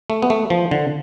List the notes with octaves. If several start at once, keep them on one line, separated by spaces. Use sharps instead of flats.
A3
B3
A3
F3
D3